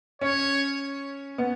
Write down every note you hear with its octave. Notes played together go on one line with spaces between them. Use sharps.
C#4 C#5
B3